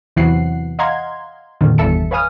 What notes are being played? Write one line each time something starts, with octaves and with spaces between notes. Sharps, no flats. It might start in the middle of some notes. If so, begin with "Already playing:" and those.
E2 C3 E3 F#3 F#5 C7
D#5 F5 F#5 A#5 C6 G#6
F2 A#2 D3 D#3
G1 E2 A4 E5 A5 C#7
B4 C#5 F5 G#5 D#6 F6